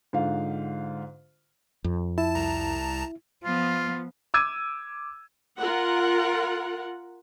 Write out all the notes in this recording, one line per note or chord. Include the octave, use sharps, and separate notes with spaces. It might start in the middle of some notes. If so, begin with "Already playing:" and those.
G#2 D3 F4 F5
F2
E4 A5
C2 A5 A#5
F3 B3 F4
D6 E6 G#6 D#7
F4 A#4 F#5